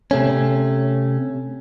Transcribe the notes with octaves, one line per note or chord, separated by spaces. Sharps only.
C3 A3 C#4